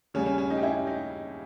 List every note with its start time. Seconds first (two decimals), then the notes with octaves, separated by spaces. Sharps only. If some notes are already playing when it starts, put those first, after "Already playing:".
0.14 D#2 C#3 G3 C#4
0.26 C#4
0.38 C#4
0.50 D#4
0.57 G4
0.63 C#4 E4
0.87 D#4